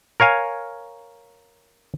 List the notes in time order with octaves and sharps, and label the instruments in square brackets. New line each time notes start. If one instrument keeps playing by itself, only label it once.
[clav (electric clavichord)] A#4 C#5 F5 G#5